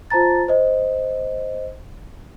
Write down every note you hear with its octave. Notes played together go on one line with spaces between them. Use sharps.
F4 C5 A5 A#5 A6
C5 D#5